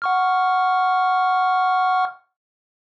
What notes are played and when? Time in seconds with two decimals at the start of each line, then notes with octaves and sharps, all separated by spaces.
0.02 F#5 C#6 F6